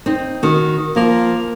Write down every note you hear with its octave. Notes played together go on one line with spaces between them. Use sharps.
C4 D#4
D#3 F#4
F3 A#3